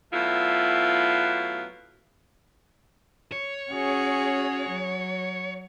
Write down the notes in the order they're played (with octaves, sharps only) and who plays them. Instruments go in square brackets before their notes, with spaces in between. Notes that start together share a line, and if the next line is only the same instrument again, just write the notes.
[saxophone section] B2 F#3 A3 E4 F4
[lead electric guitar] C#5
[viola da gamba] C#4 F#4 G#4
F#3